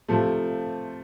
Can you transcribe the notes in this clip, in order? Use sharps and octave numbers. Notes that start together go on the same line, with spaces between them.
C3 F3 A3